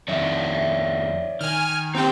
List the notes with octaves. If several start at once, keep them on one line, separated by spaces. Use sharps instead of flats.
F2 D#3 C#5 D5 E5
D#3 G#5 F6
C4 D#4 G4 G5